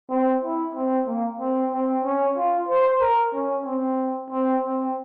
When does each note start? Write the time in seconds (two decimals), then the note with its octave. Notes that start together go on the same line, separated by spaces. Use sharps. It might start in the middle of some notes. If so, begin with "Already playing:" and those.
0.10 C4
0.43 E4
0.75 C4
1.07 A#3
1.39 C4
1.72 C4
2.04 C#4
2.37 F4
2.69 C5
3.01 A#4
3.34 C#4
3.65 C4
4.30 C4
4.62 C4